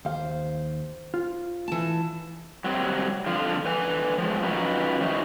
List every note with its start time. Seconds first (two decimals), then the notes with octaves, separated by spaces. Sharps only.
0.05 D#2 C5 F5
1.14 F4
1.68 E3 A5
2.64 F#3 G3 C4
3.26 F2 D3 F3 F4
3.65 D3 B4 G#5
4.18 F3 G#3
4.42 F#3 C#4 D#4 F4 B4
5.01 F3 C#4 D#4 E4 F#4